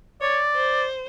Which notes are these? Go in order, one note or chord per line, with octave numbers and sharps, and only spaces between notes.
C#5 D5
C5